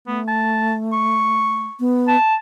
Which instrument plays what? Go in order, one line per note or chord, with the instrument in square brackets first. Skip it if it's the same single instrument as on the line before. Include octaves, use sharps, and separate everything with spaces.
[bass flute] A3 [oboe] B3
[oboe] A5
C#6
[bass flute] B3
[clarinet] A5